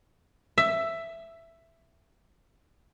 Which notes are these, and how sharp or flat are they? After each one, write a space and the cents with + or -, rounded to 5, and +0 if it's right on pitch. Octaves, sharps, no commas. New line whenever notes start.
E5 +10